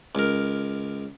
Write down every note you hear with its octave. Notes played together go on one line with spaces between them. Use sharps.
C#2 A#4